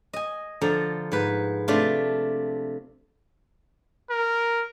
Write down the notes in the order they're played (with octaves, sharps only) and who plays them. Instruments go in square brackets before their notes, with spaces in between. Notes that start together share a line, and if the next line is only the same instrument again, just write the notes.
[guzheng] D#5 G#5
D3 F3 A4 A#5
G#2 B4
C3 A3 D4 F4
[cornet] A#4